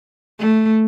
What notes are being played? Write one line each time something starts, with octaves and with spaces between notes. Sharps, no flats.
A3